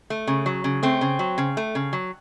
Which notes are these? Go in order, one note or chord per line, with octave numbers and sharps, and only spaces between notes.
A3
C#3
F#3
C#3
A3 C4
C#3
F#3
C#3
A3
C#3
F#3